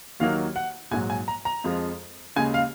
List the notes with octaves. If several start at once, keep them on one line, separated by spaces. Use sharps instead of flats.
D#2 D#3 F#3 A#3 F5
F#5
A#1 G#2 F#3 G#5
G#5
A#5
A#5
F2 F3 G#3
D#2 C#3 G#3 G#5
F5